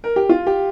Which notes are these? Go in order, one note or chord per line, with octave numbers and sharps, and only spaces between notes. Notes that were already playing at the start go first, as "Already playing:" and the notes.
A#4
G4
F4
G4